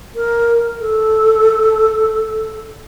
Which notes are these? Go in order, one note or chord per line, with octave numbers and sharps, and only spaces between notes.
A#4
A4